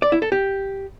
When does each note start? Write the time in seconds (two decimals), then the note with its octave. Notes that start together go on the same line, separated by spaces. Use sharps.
0.02 D5
0.12 E4
0.22 A4
0.32 G4